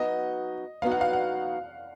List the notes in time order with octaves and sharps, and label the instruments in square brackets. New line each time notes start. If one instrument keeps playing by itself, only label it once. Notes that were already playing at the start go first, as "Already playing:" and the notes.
Already playing: [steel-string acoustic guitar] F#3 B3 D#4 F#4 [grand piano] D#5
[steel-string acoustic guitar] F#3 B3 D#4 F#4 [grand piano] F5
[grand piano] F#5
F5
F#5